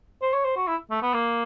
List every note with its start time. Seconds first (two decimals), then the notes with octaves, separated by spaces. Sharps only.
0.22 C5
0.34 C#5
0.45 C5
0.56 F#4
0.67 E4
0.90 A3
1.02 B3
1.13 A#3